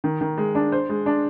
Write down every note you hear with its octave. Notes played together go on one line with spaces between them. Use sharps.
D#3
D#3
G#3
D4
C5
G#3
D4